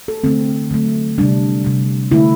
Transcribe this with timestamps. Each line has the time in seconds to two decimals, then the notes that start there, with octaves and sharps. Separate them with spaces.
0.08 A4
0.24 D3 A3 C4
0.71 D3 F#3 A3
1.18 C3 G3 D4
1.65 C3 G3
2.11 D3 A3 E4